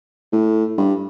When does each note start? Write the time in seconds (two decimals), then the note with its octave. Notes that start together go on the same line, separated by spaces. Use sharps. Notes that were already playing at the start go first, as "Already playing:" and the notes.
0.32 A2
0.78 G2